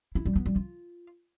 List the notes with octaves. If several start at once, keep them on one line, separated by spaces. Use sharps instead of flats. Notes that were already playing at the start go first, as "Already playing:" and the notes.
E4
G3
B3
G3
F4